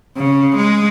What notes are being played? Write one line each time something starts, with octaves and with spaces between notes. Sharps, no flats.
C#3
G#3